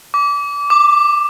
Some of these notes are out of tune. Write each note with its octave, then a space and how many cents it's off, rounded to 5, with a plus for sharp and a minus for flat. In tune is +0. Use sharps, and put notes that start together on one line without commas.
D6 -25
D6 +10